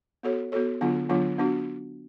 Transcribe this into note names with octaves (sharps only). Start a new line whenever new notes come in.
B3 F#4 A4 C#5
B3 F#4 A4 C#5
D3 F#3 B3 D4 F4
D3 F#3 B3 D4 F4
B3 D4 F#4